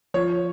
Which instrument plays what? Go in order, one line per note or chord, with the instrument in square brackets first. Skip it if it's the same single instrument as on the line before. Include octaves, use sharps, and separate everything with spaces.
[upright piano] F3 C#5